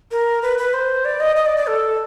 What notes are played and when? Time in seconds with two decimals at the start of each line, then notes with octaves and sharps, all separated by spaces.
0.11 A#4
0.42 B4
0.58 B4
0.73 C5
1.05 D5
1.20 D#5
1.36 D#5
1.46 D5
1.57 D5
1.67 A4